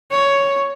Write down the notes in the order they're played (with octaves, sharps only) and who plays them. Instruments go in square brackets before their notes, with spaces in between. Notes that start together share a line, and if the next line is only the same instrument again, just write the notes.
[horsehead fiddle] C#5